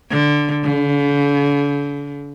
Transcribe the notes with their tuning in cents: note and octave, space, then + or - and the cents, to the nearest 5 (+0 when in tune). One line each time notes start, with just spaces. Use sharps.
D3 +0
D3 -45